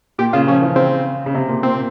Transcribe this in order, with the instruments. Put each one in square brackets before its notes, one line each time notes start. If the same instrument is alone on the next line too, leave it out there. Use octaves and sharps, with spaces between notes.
[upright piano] A#2 [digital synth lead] G4
[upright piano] C#3 [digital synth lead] F4
[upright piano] F3 [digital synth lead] C#4
[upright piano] E3
[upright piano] C#3 [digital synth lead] C4
[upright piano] C#3
C3
A#2
[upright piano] A#2 [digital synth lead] C4